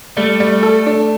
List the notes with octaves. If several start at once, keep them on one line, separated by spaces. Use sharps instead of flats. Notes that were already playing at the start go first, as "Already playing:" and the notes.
G3 A3
G3
A4
D4